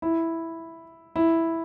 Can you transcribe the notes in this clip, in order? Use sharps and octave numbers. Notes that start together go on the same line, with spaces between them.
E4
E4